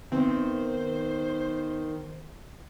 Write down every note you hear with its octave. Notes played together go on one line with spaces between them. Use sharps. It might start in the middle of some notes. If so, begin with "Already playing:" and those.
D#3 B3 C4 C5